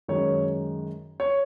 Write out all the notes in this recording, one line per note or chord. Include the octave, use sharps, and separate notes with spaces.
F#2 D#3 G#3 C#5
C#5